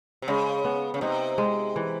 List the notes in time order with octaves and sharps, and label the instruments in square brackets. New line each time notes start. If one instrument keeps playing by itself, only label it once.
[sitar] C3
[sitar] C#3 [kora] G#3
[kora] B3
[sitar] C#3
[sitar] C3 [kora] D#4
[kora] G#3
E3